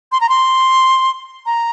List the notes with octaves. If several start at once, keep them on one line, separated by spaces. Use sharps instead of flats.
C6
A#5
C6
A#5